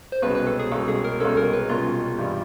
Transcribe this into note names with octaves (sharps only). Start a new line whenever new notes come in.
C5
C2 B2 G#3 C#4 B4
B4
A4
G#4
C2 B2 G#3 C#4 A4
G#4
A#4
C2 B2 G#3 C#4 A4
A#4
B4
C2 B2 G#3 C#4 F4
G2 E3 G3